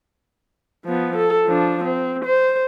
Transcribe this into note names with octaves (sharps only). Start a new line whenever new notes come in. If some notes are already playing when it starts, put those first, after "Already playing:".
F3 B3
A4
F3 D4
C4
C5